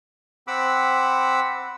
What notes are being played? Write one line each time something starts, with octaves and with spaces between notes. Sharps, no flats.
C4 F#5 B5 D6 E6